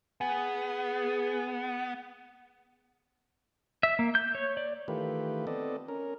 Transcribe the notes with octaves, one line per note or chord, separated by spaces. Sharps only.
B3 G#4
E5
A#3
G6
C#5
D5
D#3 E3 A3 F4 G4 B4
B3 C4 A4 D5 D#5
C#4 A#4